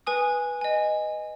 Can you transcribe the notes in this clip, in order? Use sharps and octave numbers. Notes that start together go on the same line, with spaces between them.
B4 G#5 D#6
D#5 G#5